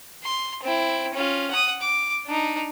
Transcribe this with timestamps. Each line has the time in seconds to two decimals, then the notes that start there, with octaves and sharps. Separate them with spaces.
0.23 C6
0.63 C4 E4
1.14 C#4 F4
1.51 F#5 D#6
1.81 D6
2.26 D4 D#4